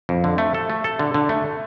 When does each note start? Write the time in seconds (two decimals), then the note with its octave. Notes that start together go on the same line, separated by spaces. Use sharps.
0.09 F2
0.24 D3
0.38 A3
0.54 A4
0.70 A3
0.84 A4
0.99 D3
1.14 D3
1.29 A3